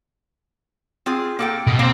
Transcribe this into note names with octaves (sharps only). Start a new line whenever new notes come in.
C4 F4 G#4
A#3 A4 G5
B2
A#3 C4 C5